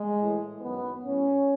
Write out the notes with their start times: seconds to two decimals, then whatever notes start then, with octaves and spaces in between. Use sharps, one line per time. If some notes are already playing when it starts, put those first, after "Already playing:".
Already playing: G#3
0.20 A2 E3
0.61 F#2 D#3 F#3 B3
1.04 A2 F#3 C#4